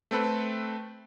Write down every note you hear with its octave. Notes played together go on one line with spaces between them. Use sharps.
A3 C4 A4 B4